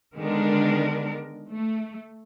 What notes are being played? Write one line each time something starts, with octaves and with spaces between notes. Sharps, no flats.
D3 D#3 G#3 B3 D4 A#4
A3